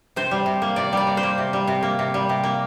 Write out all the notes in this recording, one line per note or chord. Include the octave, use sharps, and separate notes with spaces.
C3 C5
G3
C3
A#3
C3 D5
G3 D5
C3
C5
A#3
C3
G3
C3
A#3
C3
G3
C3
A#3